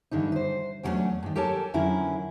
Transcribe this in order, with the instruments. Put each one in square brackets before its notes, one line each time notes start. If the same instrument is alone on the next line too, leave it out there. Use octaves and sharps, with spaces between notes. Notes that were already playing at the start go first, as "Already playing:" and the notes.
[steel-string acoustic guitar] G2 D3 E3 D#4
B4 C5
E2 F#3 G3 A3 C#4 D4
G2 D#3
G4 A4 A#4 C#5 G#5 A5
F2 D3 F#3 C#4 E4 A#4